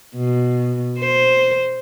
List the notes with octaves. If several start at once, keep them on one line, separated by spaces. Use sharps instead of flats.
B2
C5